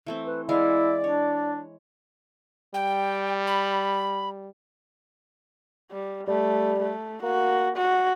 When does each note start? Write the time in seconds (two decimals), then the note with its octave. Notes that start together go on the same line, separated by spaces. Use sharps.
0.06 E3 A3 C4
0.26 B4
0.49 E3 G#3 E4 D5 F5
1.04 D4 C#5
2.74 G3 G5
3.47 B5
5.91 G3
6.28 G3 A3
6.80 A3
7.23 A#3 F#4
7.77 F#4